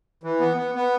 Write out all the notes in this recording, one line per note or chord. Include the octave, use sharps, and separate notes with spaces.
E3
B3
B3
B3